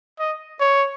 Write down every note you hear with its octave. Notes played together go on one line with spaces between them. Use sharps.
D#5
C#5